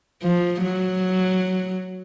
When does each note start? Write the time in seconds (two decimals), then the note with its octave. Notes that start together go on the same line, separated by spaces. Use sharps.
0.23 F3
0.63 F#3